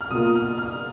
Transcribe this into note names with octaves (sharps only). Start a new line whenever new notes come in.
F6
B2 A#3 F4 D#6
F6
F6